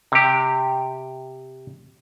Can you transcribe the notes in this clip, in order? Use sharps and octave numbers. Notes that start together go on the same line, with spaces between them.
C3 G4